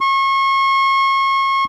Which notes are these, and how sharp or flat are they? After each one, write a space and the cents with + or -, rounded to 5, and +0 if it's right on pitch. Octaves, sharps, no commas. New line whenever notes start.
C#6 -35